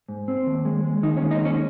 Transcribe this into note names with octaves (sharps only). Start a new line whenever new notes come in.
G#2
C4
D#2
G#3
G#3
D#2 D#3 D#4
C#4 C#5
G#3
D#4 D#5
D#2 C#4 C#5